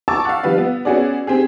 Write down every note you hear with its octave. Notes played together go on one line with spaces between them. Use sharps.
A5 A#5 C#6 D6 E6 A6
F5 F#5
F3 G3 B4 F5
B3
B3 C#4 F#4 G#4 D5
C4 G4 G#4